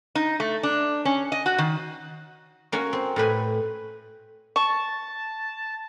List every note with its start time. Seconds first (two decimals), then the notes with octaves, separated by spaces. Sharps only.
0.15 D#4
0.40 A3
0.63 D4
1.05 C#4
1.32 D#5
1.46 F#4
1.58 D#3
2.72 A#3 C#4 F#4
2.93 C4
3.16 A2 G4 B4 G#5
4.56 A5 C#6